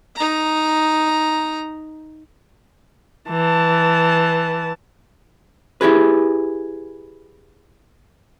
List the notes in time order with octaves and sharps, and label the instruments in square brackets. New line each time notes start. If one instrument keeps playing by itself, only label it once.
[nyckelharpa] D#4 A#5
[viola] E3 A5
[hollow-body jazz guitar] E4 G4 G#4 B4